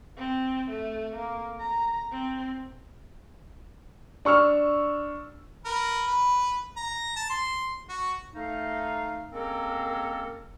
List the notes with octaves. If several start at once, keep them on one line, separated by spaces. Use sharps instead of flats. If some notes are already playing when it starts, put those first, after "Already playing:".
C4
A3
A#3
A#5
C4
D4 C#6 E6 F6
A#4 B4
B4
A#5
A5
C6
F#4
A3 D#4 F5
G#3 A#3 C4 C#4 A4 A#4